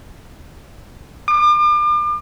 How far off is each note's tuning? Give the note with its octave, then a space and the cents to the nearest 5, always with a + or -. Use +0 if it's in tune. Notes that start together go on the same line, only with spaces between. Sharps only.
D6 +40